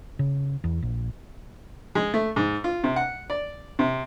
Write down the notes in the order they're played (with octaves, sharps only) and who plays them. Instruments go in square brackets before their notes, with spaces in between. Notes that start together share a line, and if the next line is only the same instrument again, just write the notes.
[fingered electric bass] C#3
E2
A#1
[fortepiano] G#3
A3
G#2
F4
C3
F#5
D5
C3